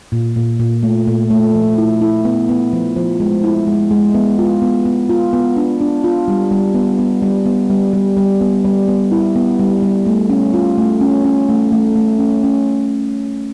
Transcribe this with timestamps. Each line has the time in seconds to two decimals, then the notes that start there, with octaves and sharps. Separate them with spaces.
0.12 A#2
0.36 A#2
0.60 A#2
0.83 A3
1.07 A#2
1.30 A3
1.55 F3
1.78 E4
2.01 E4
2.25 B3
2.49 B3
2.73 F3
2.97 F3
3.20 G#3
3.44 E4
3.67 G#3
3.91 G#3
4.14 B3
4.39 F4
4.62 B3
4.86 B3
5.09 F4
5.33 B3
5.56 D4
5.81 D4
6.04 F4
6.28 G3
6.51 G3
6.75 B3
6.99 B3
7.22 G3
7.46 B3
7.70 G3
7.93 G3
8.17 G3
8.41 B3
8.65 G3
8.88 B3
9.12 E4
9.36 B3
9.59 G3
9.82 G3
10.06 A3
10.29 C#4
10.54 F4
10.78 A3
11.01 C#4
11.24 C#4
11.49 A3
11.72 A3
11.95 A3
12.19 C#4
12.43 C#4